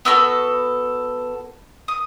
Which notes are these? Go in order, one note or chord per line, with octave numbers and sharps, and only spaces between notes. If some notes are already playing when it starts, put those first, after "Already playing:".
B3 F#4 A4 E6
D#6